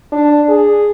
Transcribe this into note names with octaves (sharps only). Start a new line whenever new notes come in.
D4
G#4